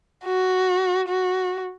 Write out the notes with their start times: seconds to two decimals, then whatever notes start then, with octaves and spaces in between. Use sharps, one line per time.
0.25 F#4
1.09 F#4